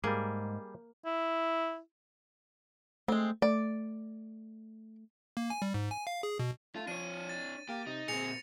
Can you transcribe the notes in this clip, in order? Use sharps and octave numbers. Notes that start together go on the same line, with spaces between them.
G#2 G3 A#3 G#4
E4
G#3 A3 C4
A3 D5
A#3
G#5
G3
G#2
G#5
F5
G#4
B2
A3 F4
F3 D4 C#5 D#7
A6
A#3 G4
C3 D#4
A#2 C4 G#4 A#6 C#7 F7